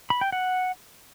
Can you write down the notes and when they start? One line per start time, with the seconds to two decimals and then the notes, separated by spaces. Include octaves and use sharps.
0.10 B5
0.21 G5
0.32 F#5